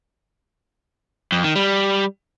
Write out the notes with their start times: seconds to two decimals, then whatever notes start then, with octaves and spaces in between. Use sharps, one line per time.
1.32 F2
1.44 D#3
1.55 G3